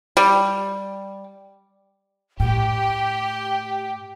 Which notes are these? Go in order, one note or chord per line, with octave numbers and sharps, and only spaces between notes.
G3
A2 G4 G5